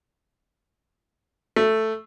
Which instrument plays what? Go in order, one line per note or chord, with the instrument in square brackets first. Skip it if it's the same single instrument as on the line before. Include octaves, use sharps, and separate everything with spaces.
[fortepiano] A3